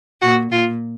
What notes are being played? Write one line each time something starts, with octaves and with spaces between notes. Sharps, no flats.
A#2 F#4
A#2 F4